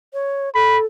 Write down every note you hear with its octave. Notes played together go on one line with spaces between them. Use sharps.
C#5
A4 B5